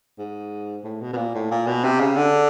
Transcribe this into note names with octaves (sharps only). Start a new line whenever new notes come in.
G#2
A2
B2
B2
A#2
A2
A#2
B2
C3
C#3
D3